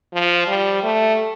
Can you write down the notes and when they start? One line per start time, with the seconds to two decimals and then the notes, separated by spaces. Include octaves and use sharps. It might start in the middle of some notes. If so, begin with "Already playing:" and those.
0.13 F3
0.48 G3
0.83 A3